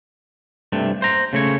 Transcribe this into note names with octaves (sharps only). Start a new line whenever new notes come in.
G2 C3 A3
C5 A#5
C#3 A3 C#5